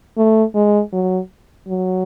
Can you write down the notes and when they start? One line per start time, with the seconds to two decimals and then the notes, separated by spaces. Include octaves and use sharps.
0.17 A3
0.54 G#3
0.92 F#3
1.68 F#3